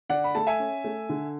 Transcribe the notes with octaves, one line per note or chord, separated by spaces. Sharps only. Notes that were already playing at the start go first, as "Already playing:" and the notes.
D3 D5 F#5
B5
A3 A5
E5 G#5
C#4
A3
D3